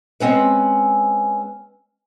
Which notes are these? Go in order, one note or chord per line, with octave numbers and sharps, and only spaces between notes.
G#3 C4 C#4 B4